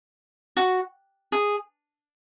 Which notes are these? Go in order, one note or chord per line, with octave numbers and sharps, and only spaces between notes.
F#4
G#4